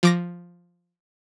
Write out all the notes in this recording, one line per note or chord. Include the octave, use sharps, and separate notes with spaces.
F3 D6 A#6